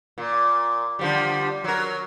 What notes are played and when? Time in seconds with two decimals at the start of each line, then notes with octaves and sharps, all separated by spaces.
0.18 A#2
0.99 D3 F3 G3
1.64 F#3 A#4